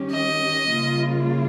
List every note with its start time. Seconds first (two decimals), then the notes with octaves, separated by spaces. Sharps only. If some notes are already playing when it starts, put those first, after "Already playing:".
Already playing: D#3 G3 C#4 G4
0.12 D#5
0.72 C#3 G3 A#3 F4